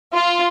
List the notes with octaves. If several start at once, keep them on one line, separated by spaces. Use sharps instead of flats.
F4